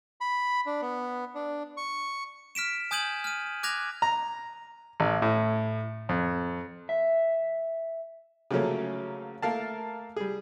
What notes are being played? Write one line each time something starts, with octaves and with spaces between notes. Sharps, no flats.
B5
D4
B3
D4
C#6
F6 B6 D7 E7
G#5 D#6 G6 G#6 D#7 F#7
F6 D#7
D6 F#6 G#6 A#6 F7
A#5
A1
A2
F2
E5
C#3 F3 F#3 A3 A#3 C#4
A3 A#3 A#4 F5 A5
G3 G#4